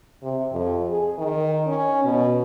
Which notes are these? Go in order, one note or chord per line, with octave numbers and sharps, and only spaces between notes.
C3
F2
G#4
D#3
C#4
B2